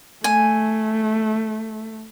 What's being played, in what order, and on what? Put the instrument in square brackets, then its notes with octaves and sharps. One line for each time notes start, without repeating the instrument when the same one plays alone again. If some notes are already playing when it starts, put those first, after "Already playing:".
[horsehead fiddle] A3 [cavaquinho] G#5